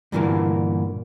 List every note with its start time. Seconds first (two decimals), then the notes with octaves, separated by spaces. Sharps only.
0.12 G2 A#2 D3 E3 A3 A#3